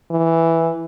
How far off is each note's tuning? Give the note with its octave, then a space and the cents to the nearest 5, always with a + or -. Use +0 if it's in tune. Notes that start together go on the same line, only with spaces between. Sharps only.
E3 +0